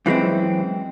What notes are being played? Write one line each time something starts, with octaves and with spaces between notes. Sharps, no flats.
F#2 E3 G#3 C4